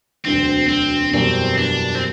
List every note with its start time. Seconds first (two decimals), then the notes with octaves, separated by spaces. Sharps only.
0.25 E1 D2 D3 F#3 C4
0.69 C4
1.13 F#1 E2 B2 G3 C4
1.58 D4
1.95 C4